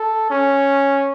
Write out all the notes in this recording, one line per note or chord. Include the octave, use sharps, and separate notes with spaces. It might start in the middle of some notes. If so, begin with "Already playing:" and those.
Already playing: A4
C#4